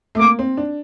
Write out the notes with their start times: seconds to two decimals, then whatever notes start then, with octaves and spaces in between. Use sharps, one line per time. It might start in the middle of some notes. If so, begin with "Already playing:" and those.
0.15 A3
0.18 A#3 D6
0.39 C4
0.57 D4